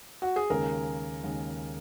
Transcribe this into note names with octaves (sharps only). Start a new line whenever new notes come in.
F#4
G#4
D#2 C#3 G#3 A#4
D#2 C#3 G#3